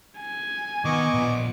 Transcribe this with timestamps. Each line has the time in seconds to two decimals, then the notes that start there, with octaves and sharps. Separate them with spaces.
0.18 G#5
0.85 D#3 B3 D#5 C#6 D6
1.14 A#2 F3